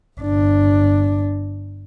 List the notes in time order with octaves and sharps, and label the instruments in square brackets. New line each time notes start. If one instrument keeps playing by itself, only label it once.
[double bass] G1 D4